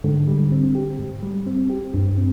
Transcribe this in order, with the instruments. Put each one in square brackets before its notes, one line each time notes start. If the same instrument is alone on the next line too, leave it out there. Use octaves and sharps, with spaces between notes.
[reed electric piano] G#2 [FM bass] D3
[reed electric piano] G3
C4
G4
G#2
G3
C4
G4
[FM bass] G2 [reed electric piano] G3
[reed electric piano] C4